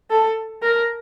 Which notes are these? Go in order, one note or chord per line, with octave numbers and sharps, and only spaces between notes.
A4
A#4